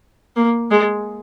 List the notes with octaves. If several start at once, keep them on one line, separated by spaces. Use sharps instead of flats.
A#3
G#3